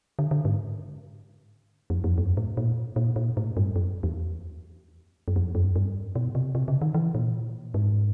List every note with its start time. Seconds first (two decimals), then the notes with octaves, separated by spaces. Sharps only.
0.19 D3
0.31 D3
0.45 G#2
1.90 F2
2.04 F2
2.18 F#2
2.37 A2
2.57 A#2
2.96 A#2
3.16 A#2
3.37 A2
3.57 G2
3.76 F#2
4.03 E2
5.28 F#2
5.36 F2
5.55 F#2
5.76 G2
6.15 B2
6.35 C3
6.55 C3
6.68 C#3
6.82 D#3
6.94 E3
7.15 A#2
7.74 G#2